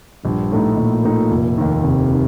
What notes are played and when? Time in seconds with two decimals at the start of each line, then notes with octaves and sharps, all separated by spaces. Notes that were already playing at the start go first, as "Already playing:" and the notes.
0.24 A#1 G2
0.51 A2 A3 D#4
0.77 A#1 A#2
1.04 A2 A3 D#4
1.31 F1
1.58 D#2 D#3
1.84 F1 C3
2.12 D#3